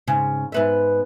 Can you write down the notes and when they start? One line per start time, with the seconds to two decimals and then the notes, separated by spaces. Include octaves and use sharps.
0.07 G#2 C#3
0.52 G#2 B3 E5